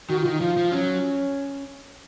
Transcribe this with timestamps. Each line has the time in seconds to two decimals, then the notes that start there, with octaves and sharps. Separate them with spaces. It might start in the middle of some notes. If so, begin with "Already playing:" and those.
0.09 D#3 F#4
0.20 F4
0.25 D#3
0.31 D#4
0.41 F3 F4
0.57 F3
0.72 F#3 C#4